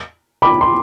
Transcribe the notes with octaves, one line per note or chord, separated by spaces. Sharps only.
B5 D6
C6